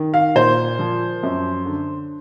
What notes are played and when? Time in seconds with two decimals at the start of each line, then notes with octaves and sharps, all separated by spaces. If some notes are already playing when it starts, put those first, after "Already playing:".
Already playing: D#3
0.14 F5
0.35 A#2 C5
0.79 F3
1.23 F#2
1.66 D3